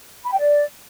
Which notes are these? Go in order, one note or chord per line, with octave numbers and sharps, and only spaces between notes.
B5
G5
D5